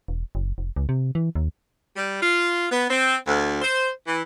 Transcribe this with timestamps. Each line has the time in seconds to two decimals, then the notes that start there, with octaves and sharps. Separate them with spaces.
0.08 E1
0.35 F#1
0.58 F1
0.76 C#2
0.89 C3
1.15 E3
1.35 D#2
1.96 G3
2.22 F4
2.71 B3
2.90 C4
3.27 D2
3.62 C5
4.07 E3